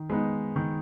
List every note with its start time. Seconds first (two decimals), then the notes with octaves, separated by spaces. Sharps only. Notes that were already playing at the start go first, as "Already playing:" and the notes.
Already playing: D#3
0.10 G#3 B3 D#4
0.56 D#3